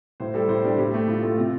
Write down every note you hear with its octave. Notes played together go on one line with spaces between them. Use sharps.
A2 C5
G3 A4
A2 C5
G3 D4
A2 G4
A3
A2 F4
A3 F4
C3 F4